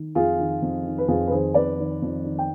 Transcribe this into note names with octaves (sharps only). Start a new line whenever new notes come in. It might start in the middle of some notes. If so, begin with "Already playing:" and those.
Already playing: D#3
F2 F4 G#4
D#3
F2
D#3
B4
F2 F4 G#4
B4
D#3 G#4 C5
F2 B4 D5
D#3
F2
D#3
G5